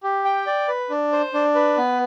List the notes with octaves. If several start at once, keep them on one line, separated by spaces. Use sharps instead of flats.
G4
G5
D5
B4
D4
C5
D4
B4
B3